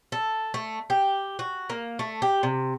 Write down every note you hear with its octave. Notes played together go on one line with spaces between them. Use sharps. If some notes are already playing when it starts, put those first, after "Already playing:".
A4
A3
G4
F#4
A#3
A3
G4
C3